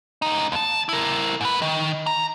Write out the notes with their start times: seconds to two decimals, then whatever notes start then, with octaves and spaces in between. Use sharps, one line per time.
0.22 C#2 D#4
0.52 D#2 A5
0.89 E4 A#4
1.41 G#2 B4
1.62 D#3
2.06 A#5